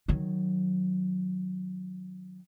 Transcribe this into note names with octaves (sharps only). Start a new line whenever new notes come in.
D#3 F#3